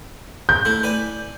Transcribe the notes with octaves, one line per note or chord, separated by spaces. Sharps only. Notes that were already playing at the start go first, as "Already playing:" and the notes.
G6
A3 E4
B4 D5 G#5